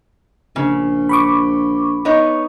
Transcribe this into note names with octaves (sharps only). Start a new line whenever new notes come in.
A#1 C#3
B5 C#6 D6
B3 D#4 C#5